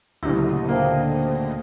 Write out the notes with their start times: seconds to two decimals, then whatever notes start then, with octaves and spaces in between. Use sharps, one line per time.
0.23 D2 A#2 C#3 F#3 E4 G4 D#5
0.69 A#3 C5 G5 A5